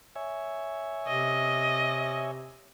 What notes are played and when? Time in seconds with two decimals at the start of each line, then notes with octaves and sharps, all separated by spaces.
0.16 C#5 E5 G#5
1.07 C3 D#5